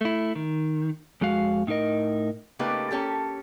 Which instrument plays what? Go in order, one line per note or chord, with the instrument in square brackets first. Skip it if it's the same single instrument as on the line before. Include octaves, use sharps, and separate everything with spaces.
[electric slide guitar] A3 E4
D#3
F2 G#3 F#4 F5
A2 D#4 E4 A#4 D#5
[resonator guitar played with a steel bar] C#3 A3 A#3 D#4 G4 B4
A#3 C#4 G4 A4